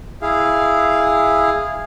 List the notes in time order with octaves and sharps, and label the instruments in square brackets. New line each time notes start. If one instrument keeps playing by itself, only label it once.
[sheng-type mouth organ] E4 G#4 F5